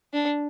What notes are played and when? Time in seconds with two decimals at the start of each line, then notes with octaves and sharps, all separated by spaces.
0.13 D4